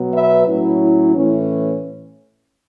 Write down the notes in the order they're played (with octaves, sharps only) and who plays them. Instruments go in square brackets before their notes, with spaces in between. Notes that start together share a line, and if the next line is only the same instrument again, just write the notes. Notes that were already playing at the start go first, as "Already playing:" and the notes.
Already playing: [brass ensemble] B2 F#3 B3
B4 E5
A2 F#3 C#4 E4
A2 E3 C#4